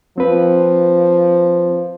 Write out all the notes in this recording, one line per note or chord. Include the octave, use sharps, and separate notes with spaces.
F3 C4 B4